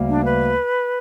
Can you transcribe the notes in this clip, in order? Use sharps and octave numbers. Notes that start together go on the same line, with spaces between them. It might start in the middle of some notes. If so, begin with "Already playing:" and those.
Already playing: D2 C#3 G3 A#3
D4
B4